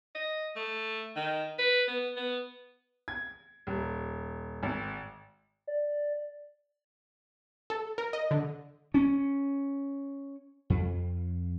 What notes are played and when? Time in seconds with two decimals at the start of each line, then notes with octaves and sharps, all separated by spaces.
0.15 D#5
0.56 A3
1.16 D#3
1.59 B4
1.87 B3
2.16 B3
3.08 G#6
3.67 D#1
4.63 G#1
5.67 D5
7.70 A4
7.98 A#4
8.13 D#5
8.31 D3
8.94 C#4
10.70 F2